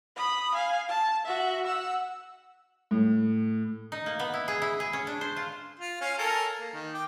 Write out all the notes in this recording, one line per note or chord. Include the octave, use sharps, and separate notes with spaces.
B5 D#6
F5 G#5
A5
F#4 E5
F#5 E6
A2
D#4
A#3
B3
E4
G#4
E4
G#4
C#4
D4
C5
F4
F4
C#4 F5
A4 A#4 G#5
A#3
D#3
G5 D6